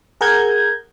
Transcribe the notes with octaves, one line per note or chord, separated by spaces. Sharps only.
G#4 A#4 F#5 A#5 G6 G#6